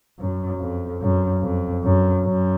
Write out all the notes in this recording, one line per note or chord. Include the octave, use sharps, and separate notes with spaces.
F#2
F2
F#2
F2
F#2
F#2